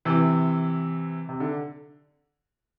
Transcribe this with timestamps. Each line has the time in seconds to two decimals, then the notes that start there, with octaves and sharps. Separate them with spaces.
0.05 C3 E3
1.29 C3
1.40 D3